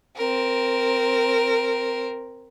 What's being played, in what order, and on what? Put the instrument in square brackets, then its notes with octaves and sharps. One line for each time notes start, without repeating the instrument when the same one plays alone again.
[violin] C4 A#4